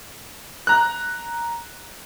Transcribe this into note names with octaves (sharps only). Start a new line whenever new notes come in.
A#5 F#6